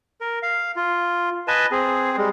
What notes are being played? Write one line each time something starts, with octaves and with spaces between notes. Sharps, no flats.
A#4
F5
F4
B4 D#5 G#5 A5
C4 G#4
G3 G#3